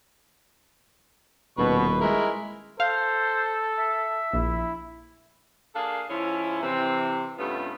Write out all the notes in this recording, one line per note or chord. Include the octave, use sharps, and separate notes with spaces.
D#1 B2 B4 C#6
G#3 E4 A#4
A4 C5 F5
E5
A#1 E4
A#3 D4 G#4 A4 F5
G#2 F3 C#4 E4
C3 E3 C4
G2 C3 A3 B3 C#4 F4